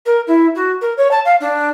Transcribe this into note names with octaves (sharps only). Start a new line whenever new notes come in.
A#4
E4
F#4
A#4
C#5
A5
F5
D4